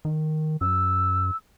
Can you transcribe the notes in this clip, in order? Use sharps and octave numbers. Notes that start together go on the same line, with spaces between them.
D#3
F#2 E6